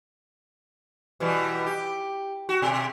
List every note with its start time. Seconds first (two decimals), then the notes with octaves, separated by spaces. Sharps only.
1.20 B2 E3 G3
1.66 G4
2.49 F#4
2.62 B2